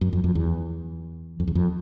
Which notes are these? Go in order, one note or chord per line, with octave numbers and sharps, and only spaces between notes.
F#2
F2
F2
E2
F2
E2
F2